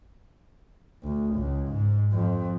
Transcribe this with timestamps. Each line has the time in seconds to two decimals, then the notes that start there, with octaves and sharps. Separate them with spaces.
1.03 D2
1.35 C#2
1.69 G#2
2.12 F2